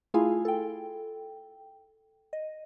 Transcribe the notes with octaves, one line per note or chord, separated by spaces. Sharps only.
A3 E4 F4 G#4 F5 G#5
A4 G5
D#5